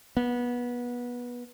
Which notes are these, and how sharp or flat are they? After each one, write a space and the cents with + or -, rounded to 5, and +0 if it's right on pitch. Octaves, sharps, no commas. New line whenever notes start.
B3 -20